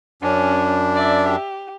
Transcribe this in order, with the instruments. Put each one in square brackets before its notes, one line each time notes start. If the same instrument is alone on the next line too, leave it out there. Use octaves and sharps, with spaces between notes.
[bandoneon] F#2 D4 [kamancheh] C#4
[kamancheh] D5 E5
G4